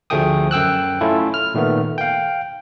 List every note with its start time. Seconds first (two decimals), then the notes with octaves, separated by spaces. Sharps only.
0.10 D2 F3 A3 G#4 G5 D#6
0.51 F#2 G5 E6 F#6
1.01 A3 C#4 E4 F4 A4
1.34 F6
1.54 A#2 D#3 A3 B3
1.98 F5 G5